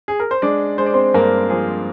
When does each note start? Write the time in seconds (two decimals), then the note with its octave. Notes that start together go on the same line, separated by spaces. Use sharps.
0.08 G#4
0.20 A#4
0.31 C5
0.42 G#3 D4 D5
0.78 G#3 C5
0.86 D5
0.94 C4 C5
1.14 G2 A#3 A#4
1.50 F3 G#4